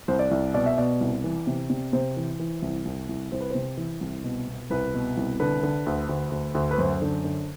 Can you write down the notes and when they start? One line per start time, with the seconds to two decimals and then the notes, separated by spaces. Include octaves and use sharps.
0.08 C2 C5
0.19 D5
0.31 C2
0.54 B2 D5
0.66 E5
0.78 B2 D5
1.01 C2
1.24 E3
1.47 C3
1.70 C3
1.93 C3 C5
2.17 E3
2.40 E3
2.62 C2
2.85 C2
3.09 C2
3.32 C2 C5
3.41 B4
3.50 C3 C5
3.77 E3
4.01 C2
4.24 B2
4.47 B2
4.70 C2 B4
4.94 B2
5.17 C2
5.40 D3 B4
5.63 D3
5.86 D2
6.09 D2
6.32 D2
6.55 D2
6.71 B4
6.78 F#2 C5
7.02 D3
7.24 D3